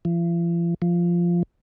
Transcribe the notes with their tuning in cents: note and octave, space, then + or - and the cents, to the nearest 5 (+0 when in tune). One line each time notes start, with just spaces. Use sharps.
F3 -45
F3 -10